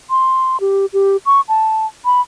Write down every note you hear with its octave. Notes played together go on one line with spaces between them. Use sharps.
C6
G4
G4
C#6
A5
B5